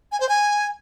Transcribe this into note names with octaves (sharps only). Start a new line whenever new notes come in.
G#5
C5
G#5